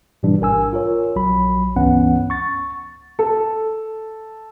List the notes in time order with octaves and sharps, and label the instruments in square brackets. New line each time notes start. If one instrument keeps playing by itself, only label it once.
[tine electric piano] G#2 B2 E3 G3 D4
A1 A#4 G#5 E6
F4 A#4 C#5
A#1 F#3 B5
C#2 G2 E3 B3 C#4 F#5
C#6 A6
[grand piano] A4